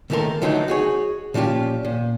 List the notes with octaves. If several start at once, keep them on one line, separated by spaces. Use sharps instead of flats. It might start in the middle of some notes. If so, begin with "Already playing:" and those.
C#2 D#3 A3 A4 A#4 C6
D3 F3 F#3 A3 D4 D#4
F#4 G#4 C#5
A#2 F3 C#4 F4 G4
A#2